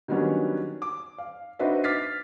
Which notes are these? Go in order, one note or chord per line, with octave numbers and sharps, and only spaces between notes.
D#3 F#3 G3 B3 C#4 D4
D6
F5
D4 D#4 F#4 B4 C5 E5
D6 F6 A6 B6 C7